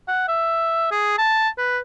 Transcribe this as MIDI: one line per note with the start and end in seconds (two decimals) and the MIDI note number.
0.08 0.28 78
0.28 0.87 76
0.91 1.16 68
1.18 1.49 81
1.58 1.78 71